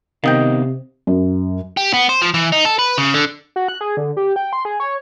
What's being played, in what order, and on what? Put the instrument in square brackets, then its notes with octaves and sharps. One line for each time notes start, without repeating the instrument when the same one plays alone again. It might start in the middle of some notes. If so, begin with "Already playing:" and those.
[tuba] C3 [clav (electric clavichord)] D#3 D#5 G5 [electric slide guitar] B3 C5 F5
[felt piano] F#2
[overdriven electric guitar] G4
B3
C5
F3
E3
D#4
A4
B4
C#3
D3
[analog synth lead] F#4
F#6
G#4
D3
G4
G5
C6
G#4
C#5